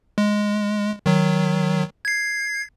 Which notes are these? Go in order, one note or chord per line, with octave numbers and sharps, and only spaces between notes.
G#3
D#3 F#3
G#6 C7